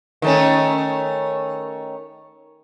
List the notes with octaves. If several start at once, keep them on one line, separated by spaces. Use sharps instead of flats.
D#3 A3 C#4